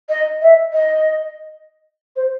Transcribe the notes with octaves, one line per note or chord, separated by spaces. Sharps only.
D#5
E5
D#5
C5